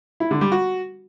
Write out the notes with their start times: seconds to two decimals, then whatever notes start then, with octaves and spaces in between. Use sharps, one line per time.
0.20 E4
0.31 D3
0.41 G3
0.52 F#4